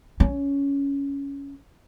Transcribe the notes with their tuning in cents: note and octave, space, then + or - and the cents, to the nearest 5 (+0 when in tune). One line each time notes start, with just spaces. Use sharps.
C#4 +10